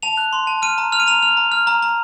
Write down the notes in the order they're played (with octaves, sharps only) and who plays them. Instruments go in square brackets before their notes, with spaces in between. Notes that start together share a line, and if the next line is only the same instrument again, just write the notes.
[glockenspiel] A5 F7
F#6
C6
A5
F6 D#7
A#5
F6 F7
D#7
A#5 F7
F6 F7
A#5
F6
A#5
A#5